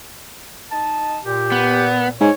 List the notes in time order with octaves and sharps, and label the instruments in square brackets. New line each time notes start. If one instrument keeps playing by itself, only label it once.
[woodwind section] D#4 D#5 A5
[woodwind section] A#2 [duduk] G4
[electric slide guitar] B3
[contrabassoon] G#2 [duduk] C#5